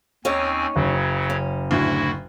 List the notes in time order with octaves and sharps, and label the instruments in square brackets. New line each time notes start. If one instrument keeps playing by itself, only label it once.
[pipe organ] D#2 C4 G#5 [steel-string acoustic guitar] C#4 D#4 C#5
[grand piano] F#1 [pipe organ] C#3 F#3
[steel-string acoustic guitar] C#4
[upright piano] D2 A2 D3 [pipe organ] E4 F#4